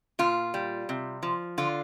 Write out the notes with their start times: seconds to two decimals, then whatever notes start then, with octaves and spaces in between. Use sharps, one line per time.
0.19 A#2 F4
0.54 G3
0.89 C3
1.23 F3
1.58 D3 F4